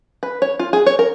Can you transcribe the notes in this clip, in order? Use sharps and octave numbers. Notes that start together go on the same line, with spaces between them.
B4
C#5
F4
G#4
C#5
A#4